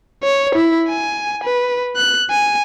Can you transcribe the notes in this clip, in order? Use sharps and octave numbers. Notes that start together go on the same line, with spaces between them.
C#5
E4
G#5
B4
F#6
G#5